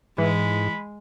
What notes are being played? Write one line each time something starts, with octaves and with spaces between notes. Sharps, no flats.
G#2 E3 G#3 B5